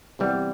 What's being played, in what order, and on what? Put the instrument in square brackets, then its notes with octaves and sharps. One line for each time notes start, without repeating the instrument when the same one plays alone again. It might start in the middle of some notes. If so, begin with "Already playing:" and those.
[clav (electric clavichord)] C3 E3 G3 B3